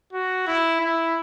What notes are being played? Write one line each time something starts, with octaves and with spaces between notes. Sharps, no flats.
F#4
E4
E4